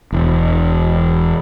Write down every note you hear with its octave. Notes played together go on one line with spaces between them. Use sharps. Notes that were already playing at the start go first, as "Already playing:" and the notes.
E1